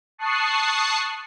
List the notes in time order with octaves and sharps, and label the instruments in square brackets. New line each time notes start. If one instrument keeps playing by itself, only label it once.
[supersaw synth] A5 C#6 D#6 F#6 C7